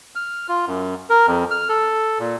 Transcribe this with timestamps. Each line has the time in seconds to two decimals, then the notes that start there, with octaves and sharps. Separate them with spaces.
0.15 F6
0.48 F4
0.67 F#2
1.10 A#4
1.28 F2
1.51 F6
1.69 A4
2.19 A#2